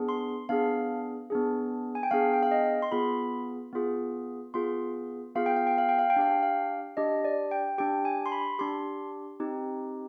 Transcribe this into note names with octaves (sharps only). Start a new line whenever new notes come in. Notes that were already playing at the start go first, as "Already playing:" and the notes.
Already playing: B3 D4 G#4
C6
B3 D4 G#4 F5
B3 D4 G#4
G#5
G5
B3 D4 G#4 F5
G5
F5
D#5
C6
B3 F4 G#4 B5
B3 F4 G#4
B3 F4 G#4 C6
B3 F4 G#4 F5
G5
F5
G5
F5
G5
F5
G5
D4 G4 F5
G5
F5
D4 G4 D#5
D5
G5
D4 G4 G5
G#5
C6
B5
D4 G4 C6
C4 D#4 G4